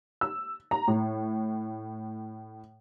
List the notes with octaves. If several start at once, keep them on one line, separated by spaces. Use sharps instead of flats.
E6
A#5
A2